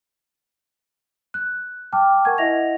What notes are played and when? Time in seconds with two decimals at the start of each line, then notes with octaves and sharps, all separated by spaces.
1.34 F#6
1.92 G5 A5 D6 F6
2.25 A#4 F#5 G#5 C#6 G#6
2.38 E4 D#5 E5 F#5 A#6 F7